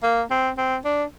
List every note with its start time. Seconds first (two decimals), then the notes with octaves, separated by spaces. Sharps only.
0.03 A#3
0.31 C4
0.58 C4
0.85 D4